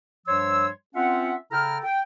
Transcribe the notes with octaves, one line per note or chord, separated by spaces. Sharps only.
G2 F3 G3 C#5 C6 E6
C4 C#4 F4 E5 F#5
C#3 E4 A4 G5 A#5 F6
G5